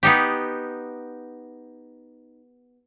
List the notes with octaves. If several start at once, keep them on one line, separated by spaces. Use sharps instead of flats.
B3 D#4 G4